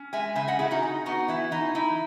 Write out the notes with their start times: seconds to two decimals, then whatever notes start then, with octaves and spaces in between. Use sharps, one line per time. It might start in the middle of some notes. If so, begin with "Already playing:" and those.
Already playing: C#4
0.13 G#3 E5 G#5
0.35 C#3 E5 G#5
0.48 D#5 F#5
0.59 C#3 E4 G#4
0.71 D#4 F#4
0.83 D#4
1.06 B3 D#4 F#4
1.28 E3 E4
1.51 E3 D#4
1.75 D#4 E4